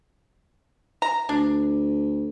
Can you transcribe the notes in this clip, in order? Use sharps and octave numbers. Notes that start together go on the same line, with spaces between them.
A#5
D2 D4